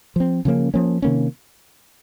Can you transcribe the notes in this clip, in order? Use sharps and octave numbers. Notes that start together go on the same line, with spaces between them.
F3 C4
C#3 F3 A#3 C#4
F3 A#3 C#4
C3 D#3 A#3 C#4